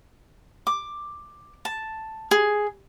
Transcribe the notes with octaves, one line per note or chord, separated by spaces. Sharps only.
D6
A5
G#4